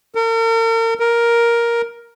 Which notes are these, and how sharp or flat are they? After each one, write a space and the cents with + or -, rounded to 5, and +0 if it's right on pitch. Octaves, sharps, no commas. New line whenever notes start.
A#4 -40
A#4 +5